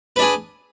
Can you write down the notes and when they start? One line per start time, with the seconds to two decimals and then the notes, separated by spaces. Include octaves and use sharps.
0.16 B4
0.19 D4
0.22 G#4